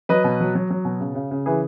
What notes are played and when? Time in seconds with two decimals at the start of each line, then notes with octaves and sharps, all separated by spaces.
0.09 F#3 B4 D#5
0.24 B2
0.41 F#3
0.55 F#3
0.71 F#3
0.85 B2
1.00 C#3
1.15 C#3
1.31 C#3
1.46 E3 G#4 B4